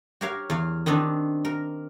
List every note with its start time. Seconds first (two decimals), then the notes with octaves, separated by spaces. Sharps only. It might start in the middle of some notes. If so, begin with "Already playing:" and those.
0.21 F#4 G4 A#4 C#5 F5
0.50 E2 F5
0.86 D#3 B3 C4 D4
1.45 A#4